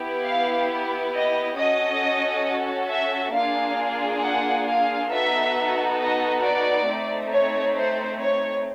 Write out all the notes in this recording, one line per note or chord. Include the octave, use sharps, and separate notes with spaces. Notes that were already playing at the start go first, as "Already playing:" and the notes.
Already playing: B3 E4 G4
F5
D#5
C#4 F#4 A4 D#5
E5
A#3 D4 F4 G#4 F5
F#5
F5
B3 D#4 F#4 A4 E5
D#5
D5
A3 C4 D#4
C#5
C5
C#5